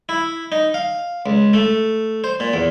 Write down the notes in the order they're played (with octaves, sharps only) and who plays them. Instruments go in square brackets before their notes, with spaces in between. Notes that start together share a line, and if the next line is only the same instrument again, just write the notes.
[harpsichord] E4
D#4
F5
C#2
A3
C5
A#2
E2